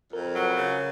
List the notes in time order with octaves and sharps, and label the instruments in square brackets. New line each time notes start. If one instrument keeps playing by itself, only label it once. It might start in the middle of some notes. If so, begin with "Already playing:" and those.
[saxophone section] F2 [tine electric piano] A#4
[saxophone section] F#3
[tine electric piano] B4
[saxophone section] C#3